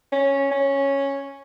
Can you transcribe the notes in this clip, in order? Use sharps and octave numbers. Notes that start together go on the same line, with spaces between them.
C#4
C#4